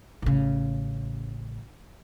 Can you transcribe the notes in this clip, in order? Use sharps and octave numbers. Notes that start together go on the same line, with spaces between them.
A1 C#3